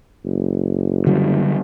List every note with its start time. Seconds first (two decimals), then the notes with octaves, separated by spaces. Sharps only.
0.24 F#1
1.06 D3 F#3 G3